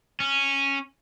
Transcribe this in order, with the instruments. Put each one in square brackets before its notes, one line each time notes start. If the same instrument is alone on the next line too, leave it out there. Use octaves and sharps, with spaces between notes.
[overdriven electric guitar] C#4